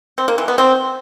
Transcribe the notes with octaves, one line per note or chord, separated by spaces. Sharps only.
C4
A#3
E3
B3
C4